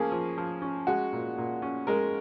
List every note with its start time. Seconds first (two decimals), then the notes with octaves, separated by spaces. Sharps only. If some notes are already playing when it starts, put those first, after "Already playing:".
Already playing: F3 A#3 C#4 G#4
0.12 F3
0.38 F3
0.62 C#4
0.87 G#3 F#4
1.13 A#2
1.38 A#2
1.62 C#4
1.87 G#3 A#4